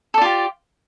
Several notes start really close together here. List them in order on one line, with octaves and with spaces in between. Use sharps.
A4 D5 F4 G4